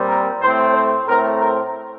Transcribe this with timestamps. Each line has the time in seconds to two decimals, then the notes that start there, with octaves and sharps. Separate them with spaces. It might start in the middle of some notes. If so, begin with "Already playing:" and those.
Already playing: A#2 G3 C4
0.09 A#4
0.41 A2 A3 C4 C5
0.74 C5
1.07 A2 A3 C4 A#4
1.41 A#4